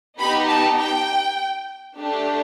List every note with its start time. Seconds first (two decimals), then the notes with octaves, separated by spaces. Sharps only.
0.18 B3 D#4 G4 B5
0.48 A5
0.78 G5
1.97 A3 D4 G4